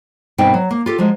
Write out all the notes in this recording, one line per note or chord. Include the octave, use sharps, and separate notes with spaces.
G2 B2 D#3 C4 D#4 G5
F#3
A#3
F4 G4 A4
F3 F#3 G#3